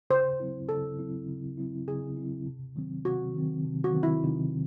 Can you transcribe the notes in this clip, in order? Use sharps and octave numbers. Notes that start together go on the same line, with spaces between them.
C#3 C5
F#3 C4 E4
C#3 A4
F#3 C4 E4
C#3
F#3 C4 E4
C#3 G#4
F#3 C4 E4
C3
D#3 F#3 C4
C3 F#4
D#3 F#3 C4
C3
F#4
D#3 F#3 C4
E4
C3 D#4